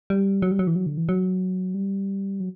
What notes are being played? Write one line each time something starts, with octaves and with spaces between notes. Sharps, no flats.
G3
F#3
G3
F#3
E3
F#3
D3
E3
F#3
G3
F#3